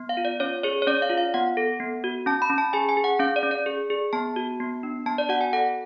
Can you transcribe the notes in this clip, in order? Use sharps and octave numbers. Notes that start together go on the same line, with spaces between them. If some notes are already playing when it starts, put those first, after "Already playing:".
Already playing: B3
F5
F4
D5
C#4 C#5
G#4 C#5
C#5
C#4 D5
F5
F4
F5
B3 F#5
A4
B3
F#4
C#4 A5
B5
C#4
A5
G#4 G#5
G#5
G#4
F#5
C#4 F5
D5
C#4
D5
G#4
G#4
B3 A5
F#4
B3
D4
B3 A5
D5
F#4 F#5
G#5
A4 F#5